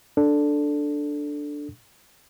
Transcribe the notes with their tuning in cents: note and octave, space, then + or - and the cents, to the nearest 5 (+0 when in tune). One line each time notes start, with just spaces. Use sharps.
D4 +0 A4 +0